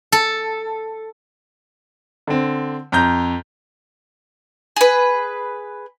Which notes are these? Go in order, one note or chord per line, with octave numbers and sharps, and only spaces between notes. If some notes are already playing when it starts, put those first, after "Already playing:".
A4
D3 C4
F2 A#5 G6
G#4 B4